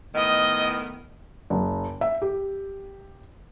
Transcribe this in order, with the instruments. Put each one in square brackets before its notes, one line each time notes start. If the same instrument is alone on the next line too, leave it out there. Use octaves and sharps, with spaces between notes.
[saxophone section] A2 D#3 B3 [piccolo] D#5
[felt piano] F#1
E5
G4